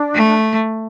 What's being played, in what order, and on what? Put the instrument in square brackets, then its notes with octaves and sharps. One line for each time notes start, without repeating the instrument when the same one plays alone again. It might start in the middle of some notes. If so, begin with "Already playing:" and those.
Already playing: [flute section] D4
[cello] A3